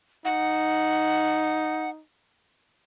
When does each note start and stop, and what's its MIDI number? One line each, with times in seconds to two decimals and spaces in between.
0.25 2.02 63
0.25 1.90 78